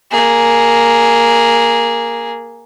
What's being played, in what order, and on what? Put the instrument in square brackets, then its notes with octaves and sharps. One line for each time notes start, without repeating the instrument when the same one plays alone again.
[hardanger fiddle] A#3 G#4